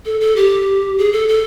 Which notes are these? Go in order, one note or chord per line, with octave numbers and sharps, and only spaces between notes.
A4
A4
G4
G#4
A4
A4